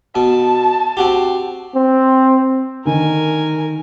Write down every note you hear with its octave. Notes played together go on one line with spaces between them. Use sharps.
B2 A5
C4 F#4 G4
C4
D3 D#3 A#4 G#5